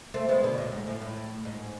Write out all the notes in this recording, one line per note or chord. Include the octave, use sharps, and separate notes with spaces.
A3 C4
G#3 B3
B2 D3
A2
G#2
A2
A2
G#2